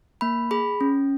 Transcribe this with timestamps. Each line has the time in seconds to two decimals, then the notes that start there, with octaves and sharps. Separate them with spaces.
0.21 A#3 B5
0.51 G#4 B5
0.81 C#4